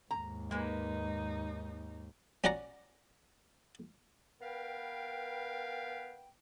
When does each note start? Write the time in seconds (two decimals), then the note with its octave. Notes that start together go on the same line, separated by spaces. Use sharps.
0.11 D#2 G#2 A#5
0.51 G#3 A#3 D#4 B4
2.44 C#4 F#4 D5 F#5 A#5
4.41 B3 A#4 B4 F5 G5